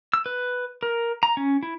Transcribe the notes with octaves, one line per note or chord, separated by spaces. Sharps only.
E6
B4
A#4
A#5
C#4
E4